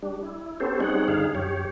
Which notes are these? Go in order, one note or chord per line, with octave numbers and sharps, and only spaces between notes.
G3 D4
E4
B3 C#4 G4 A4 C5
G3 C4 C#4 D#4 G#4 F#5
G2 D3 D#4 G#4 F5
F#2 G4 C#5